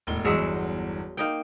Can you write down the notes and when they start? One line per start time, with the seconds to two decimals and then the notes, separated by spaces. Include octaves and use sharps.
0.07 E1 A2 G7
0.25 G1 E2 F#3 G#3 E5
1.17 A#3 D#4 G5